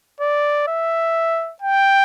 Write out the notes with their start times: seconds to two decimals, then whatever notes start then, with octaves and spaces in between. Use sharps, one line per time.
0.21 D5
0.68 E5
1.62 G5